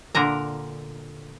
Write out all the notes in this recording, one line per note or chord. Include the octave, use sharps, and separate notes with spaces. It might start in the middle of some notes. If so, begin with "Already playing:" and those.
A#2 D3 A#4 A#5